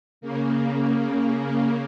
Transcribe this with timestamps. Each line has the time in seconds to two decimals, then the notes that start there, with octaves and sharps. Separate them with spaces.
0.21 C#3 A#3